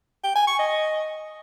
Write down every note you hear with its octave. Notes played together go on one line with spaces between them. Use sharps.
G5
G#5
C#6
D#5